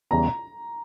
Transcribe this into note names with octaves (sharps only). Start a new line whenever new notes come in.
E2 C#3 G3 B3 A#5